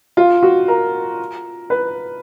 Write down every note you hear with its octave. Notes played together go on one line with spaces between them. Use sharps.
F4
F#4
A#4
B4